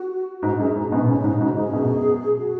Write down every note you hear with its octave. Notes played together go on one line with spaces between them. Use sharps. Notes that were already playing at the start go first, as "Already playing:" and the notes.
Already playing: F#4
G#2 F#4
F#2 G#4
G#2
F#2 B2 D#4
G#2 C#3 C#4
G#2 C#3 D#4
G#2 C#3 F#4
G#2 G#4
F#2 B2
F#4